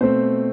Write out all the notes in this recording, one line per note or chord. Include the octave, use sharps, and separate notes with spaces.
B2 A3 C4 C5